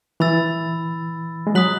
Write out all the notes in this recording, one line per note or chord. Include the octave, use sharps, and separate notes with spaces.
E3 B5 E6 A6
G#3
F#3 D#6 F#6 B6 F#7